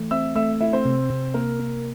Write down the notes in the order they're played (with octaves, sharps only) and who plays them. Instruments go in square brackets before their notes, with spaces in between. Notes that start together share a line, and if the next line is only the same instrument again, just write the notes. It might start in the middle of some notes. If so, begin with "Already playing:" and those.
Already playing: [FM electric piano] E3 A3
[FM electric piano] C4 [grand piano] E5 E6
[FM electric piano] A3 [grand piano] E5 E6
[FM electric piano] A3 [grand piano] E4 E5
[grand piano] C4 C5
[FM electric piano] C3
C3
[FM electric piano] A#3 [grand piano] A#4
[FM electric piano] A#3